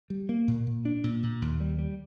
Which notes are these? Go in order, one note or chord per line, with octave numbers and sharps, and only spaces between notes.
G3
A#3
A#2
A#2
D4
A#2
A#2
D#2
G3
G3